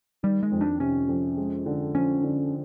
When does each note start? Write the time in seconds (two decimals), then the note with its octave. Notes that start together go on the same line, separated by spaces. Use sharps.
0.23 D#3 G3
0.43 G#3
0.52 F2
0.61 D4
0.80 C3 C#4
1.09 F2
1.37 G#3
1.66 D3
1.95 F3 C#4
2.23 D3